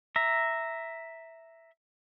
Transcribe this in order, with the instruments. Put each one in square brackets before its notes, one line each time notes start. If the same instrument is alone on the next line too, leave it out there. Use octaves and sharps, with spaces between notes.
[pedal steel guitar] E5 A#5